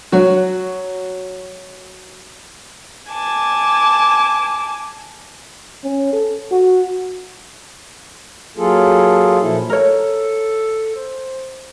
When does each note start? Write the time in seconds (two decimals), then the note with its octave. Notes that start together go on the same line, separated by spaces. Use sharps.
0.12 F#3 F#4
3.09 G#5 A5 D6
5.84 C#4
6.13 A4
6.52 F#4
8.57 F#3 A#3 F4 G#4 A4
9.40 A#2 F3 E4 A4
9.70 A4 A#4 C#5
10.96 C5